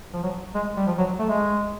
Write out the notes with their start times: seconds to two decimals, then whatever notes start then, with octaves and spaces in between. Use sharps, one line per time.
0.13 F3
0.23 F#3
0.55 G#3
0.77 G3
0.86 F3
0.98 F#3
1.19 A3
1.29 G#3